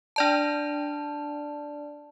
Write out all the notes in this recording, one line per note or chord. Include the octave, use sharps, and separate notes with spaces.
D4 D5 A5